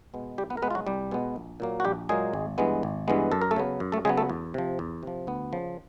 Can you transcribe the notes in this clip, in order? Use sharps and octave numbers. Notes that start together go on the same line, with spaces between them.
B2 G#3 B3
C2 G3 G4
B3 B4
A#4
B2 G#3 B3 B4
F4
F#3 F#4
C2 G3 G4
B2 G#3 B3
A#1
A#2 F#3 A#3
F#4
A#1 G3 G4
A#2 F#3 G#3 A#3 G#4
G#1
G2 E3 G#3 B3
G#1
G2 E3 G#3 B3
F#2 A4
A#4
A3 A4
C#3 F#3 B3
F#2
A3 A4
C#3 F#3 G#3 B3 G#4
A3 A4
E2
C3 F3
E2
C3 F3
D2 B3
C#3 F3